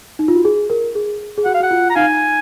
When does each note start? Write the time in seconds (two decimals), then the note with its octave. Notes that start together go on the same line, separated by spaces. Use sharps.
0.19 D#4
0.28 F4
0.36 F#4
0.45 G#4
0.70 A#4
0.95 G#4
1.38 G#4
1.45 F#4 F#5
1.54 F5
1.60 F#4 F#5
1.71 F4
1.90 A#5
1.96 D#4 F5 G#5